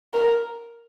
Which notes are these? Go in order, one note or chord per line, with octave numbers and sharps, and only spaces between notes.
A#4